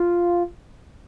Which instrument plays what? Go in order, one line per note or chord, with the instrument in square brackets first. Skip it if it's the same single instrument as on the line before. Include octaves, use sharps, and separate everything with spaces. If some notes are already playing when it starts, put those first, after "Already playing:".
Already playing: [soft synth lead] F4